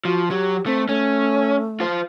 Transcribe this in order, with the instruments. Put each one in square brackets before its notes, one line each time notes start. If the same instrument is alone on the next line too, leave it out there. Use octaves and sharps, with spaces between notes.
[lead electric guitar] F3 [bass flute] F#4
[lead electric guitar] F#3 [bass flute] G4
[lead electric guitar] A3 [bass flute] C4
[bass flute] A3 [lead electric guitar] C#4
[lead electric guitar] F4 C5